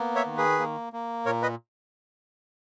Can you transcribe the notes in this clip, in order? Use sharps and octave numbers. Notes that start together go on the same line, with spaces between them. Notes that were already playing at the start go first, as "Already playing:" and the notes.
Already playing: A#3 B3
C#5 E5
D#3
G#4 B4
A#3
A#3
A#2 A#4 C#5
B4 D#5